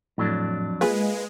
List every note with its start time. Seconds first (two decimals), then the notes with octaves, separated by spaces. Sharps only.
0.18 F2 A2 F#3 D4
0.81 G#3 A#3 F4 G#4 B4